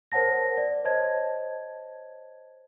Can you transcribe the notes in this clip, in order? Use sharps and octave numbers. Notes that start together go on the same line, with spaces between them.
A#4 C5 C#5 F#5 A5 A#6
D5
C5 C#5 D#5 A5 G#6